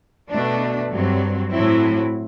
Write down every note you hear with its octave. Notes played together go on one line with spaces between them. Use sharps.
B2 A3 D4
G2 F#3 C4
A2 F#3 C4 E4